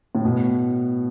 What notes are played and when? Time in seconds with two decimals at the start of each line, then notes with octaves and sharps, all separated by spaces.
0.15 A2
0.24 B2